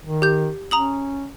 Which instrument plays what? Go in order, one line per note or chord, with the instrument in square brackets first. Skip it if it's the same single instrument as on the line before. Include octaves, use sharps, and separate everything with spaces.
[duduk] D#3
[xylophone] G4 G6
[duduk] C#4 [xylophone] A#5 D#6 F#7